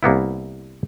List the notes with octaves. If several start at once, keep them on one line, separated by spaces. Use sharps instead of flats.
C2 A#3 B3 E4